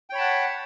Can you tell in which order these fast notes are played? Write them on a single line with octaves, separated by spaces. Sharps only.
G5 C#5 B5 A5 F#5